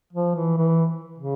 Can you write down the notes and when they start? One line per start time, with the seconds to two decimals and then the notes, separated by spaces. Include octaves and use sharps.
0.13 F3
0.35 E3
0.58 E3
1.18 C#3